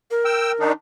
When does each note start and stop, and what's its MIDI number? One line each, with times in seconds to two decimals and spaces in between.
0.11 0.70 70
0.25 0.52 79
0.25 0.52 88
0.60 0.72 51
0.60 0.72 62
0.60 0.72 63